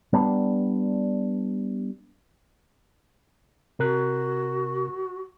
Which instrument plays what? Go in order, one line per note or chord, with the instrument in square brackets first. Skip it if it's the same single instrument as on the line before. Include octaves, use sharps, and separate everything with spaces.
[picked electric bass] G3 B3 D4
[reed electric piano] C3 A#4 F#6 [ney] F#4